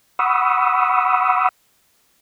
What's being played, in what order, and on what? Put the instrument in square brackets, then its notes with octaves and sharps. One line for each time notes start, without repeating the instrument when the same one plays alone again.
[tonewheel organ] F#5 B5 C#6 D#6 E6